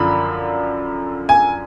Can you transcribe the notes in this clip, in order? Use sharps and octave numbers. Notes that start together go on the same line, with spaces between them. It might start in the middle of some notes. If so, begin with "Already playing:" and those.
Already playing: F#2 D3 F3 B5
G#5